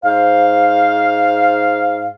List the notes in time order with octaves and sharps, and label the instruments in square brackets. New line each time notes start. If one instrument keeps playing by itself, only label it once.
[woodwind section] G#2 C5 F5